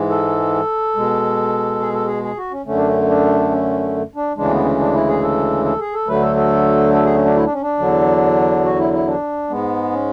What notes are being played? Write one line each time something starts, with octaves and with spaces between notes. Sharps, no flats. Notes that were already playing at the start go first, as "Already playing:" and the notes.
Already playing: G#2 E3 G#3
A4
B2 G#3
G#4
A4
G#4
G#4
F#4
C#4
F#2 D3 A3 C#4
D4
C#4
D4
C#4
D4
D2 C#3 E3 G#3 D4
B3
C#4
D4
E4
G#4
A4
A4
G#4
A4
D2 D3 F#3 A3 B4
A4
A4
A4
G#4
C#4
D4
E4
D4
C#4
D4
E2 D3 F#3
F#4
E4
E4
D4
G#2 G#3 B3
C#4